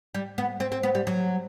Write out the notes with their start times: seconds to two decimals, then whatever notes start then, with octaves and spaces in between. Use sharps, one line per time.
0.14 G3
0.38 B3
0.60 C4
0.72 C4
0.83 B3
0.95 G3
1.07 F#3